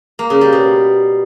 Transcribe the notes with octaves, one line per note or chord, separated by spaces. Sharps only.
A#3
C#3
G3
B2